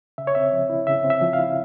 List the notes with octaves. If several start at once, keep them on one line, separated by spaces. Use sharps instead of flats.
C#3 E5
C#5
C4 E5
F3
E4
C#3 E5
C4
E5
F3
F5
E4